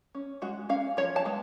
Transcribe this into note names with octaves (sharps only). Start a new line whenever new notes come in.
C#4
G#3 F#4
C#4 F5
F3 C#5
A5
G#3 B3